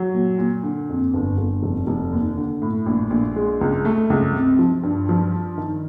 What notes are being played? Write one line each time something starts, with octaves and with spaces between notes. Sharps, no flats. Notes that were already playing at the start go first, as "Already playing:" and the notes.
Already playing: F#3
A#2
A#2
D3
F2
G1
G1
F1
F1
D#2
D3
A2
A#1
A#1
G#3
C#2
A3
C#2
C3
F3
G2
F3
G2
D#3